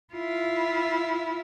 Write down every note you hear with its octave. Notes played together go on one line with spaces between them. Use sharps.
E4 F4